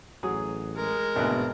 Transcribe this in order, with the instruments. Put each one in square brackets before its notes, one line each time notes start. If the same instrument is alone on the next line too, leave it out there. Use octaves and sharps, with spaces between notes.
[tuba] A1 [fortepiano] F#3 G#4 D#6
[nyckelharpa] G#3 A#4
[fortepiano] G#1 D2 B4 [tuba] B2